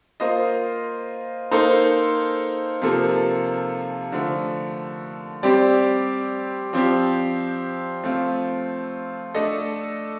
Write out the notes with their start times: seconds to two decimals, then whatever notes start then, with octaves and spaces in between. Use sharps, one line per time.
0.20 A#3 F4 C5 D#5
1.51 A#3 D#4 A4 C5
2.82 C3 F3 A#3 F4 A4
4.12 D3 F3 A3
5.43 G3 C4 G4 D5
6.73 F3 C4 G4
8.04 F3 A3 C4 F4
9.34 A3 D4 A4 D#5